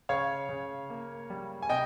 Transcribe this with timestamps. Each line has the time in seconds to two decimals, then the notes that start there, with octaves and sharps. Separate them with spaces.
0.09 C#3 C#5 F5
0.49 C#3
0.90 A#3
1.30 G3
1.62 G#5
1.69 C3 D#5 G5